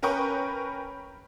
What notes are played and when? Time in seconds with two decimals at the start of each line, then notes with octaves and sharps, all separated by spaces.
0.03 C#4 A#4 B4 G5 C#6